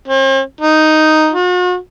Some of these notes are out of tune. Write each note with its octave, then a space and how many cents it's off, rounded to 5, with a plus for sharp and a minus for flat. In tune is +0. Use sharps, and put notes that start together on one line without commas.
C4 +45
D#4 +0
F#4 -45